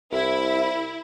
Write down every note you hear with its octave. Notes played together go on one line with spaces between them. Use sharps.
C2 E4